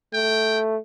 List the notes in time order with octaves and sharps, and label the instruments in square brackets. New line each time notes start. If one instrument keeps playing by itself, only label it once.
[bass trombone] A3 [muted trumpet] G5